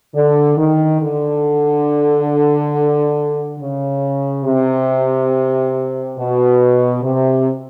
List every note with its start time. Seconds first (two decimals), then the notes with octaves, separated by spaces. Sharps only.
0.15 D3
0.58 D#3
1.01 D3
3.59 C#3
4.45 C3
6.18 B2
7.03 C3